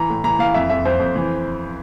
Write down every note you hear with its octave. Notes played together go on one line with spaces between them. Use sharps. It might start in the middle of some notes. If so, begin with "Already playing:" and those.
Already playing: E3 A#5
A2
E3 A#5
E3 F5
F2 E5
F2 E5
F2 C5
F2
E3